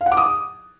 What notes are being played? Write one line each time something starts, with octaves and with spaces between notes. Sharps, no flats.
F5
F#5
D6
D#6